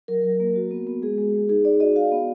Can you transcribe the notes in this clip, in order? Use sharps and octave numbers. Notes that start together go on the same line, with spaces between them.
F#3 A#4
F#3
A#3
F#4
B3
B3
G#3 G#4
G#3
G#3
D#4 G#4
D#4 D5
F#4 D#5
F#4 F5
B3